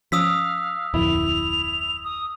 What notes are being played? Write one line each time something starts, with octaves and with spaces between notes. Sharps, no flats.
F3 C#4 F5 D#6 E6 B6
D1 F2 E4 F7
D#6